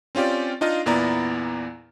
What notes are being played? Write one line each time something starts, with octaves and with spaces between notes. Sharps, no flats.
C4 C#4 F4 G4 D5
D4 D#4 F4 D#5 F5 F6
E2 A#2 B3 E4 D5 A#5